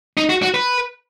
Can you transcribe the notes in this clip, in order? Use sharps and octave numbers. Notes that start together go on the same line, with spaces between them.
D#4
F#4
F#4
B4